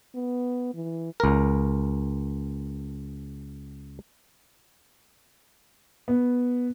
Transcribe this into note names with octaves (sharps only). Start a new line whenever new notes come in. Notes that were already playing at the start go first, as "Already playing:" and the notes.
B3
E3
C#2 A#4
B3